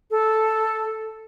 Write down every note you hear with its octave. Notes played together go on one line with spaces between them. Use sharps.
A4